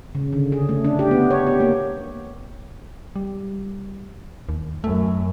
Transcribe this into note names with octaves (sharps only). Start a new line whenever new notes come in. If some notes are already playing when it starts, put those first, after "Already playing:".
C#3
D3
G#4
A3
D4
G4
B3
C#5
G4
A#3
G3
D#2
F#2 A3